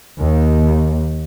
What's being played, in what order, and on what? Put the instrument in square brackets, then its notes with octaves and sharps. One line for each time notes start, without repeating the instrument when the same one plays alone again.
[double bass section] D#2